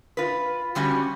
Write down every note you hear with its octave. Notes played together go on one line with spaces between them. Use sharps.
F4 B4
D3 G3 C#4 F#4